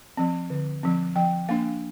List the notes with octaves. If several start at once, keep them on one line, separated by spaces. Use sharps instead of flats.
F3 C4
D3
F3 C4
F3 G5
A#3 D4 F5